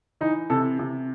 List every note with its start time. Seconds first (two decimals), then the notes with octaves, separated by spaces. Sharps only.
0.21 E3 D#4
0.50 C3 A4
0.79 C3